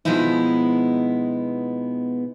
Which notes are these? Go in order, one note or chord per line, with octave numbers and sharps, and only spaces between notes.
B2 F3 G#3 B3 D#4 E4